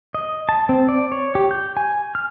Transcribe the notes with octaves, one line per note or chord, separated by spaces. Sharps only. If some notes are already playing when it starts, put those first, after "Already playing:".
D#5
A5
C4
D5
C#5
G4
G6
G#5
F6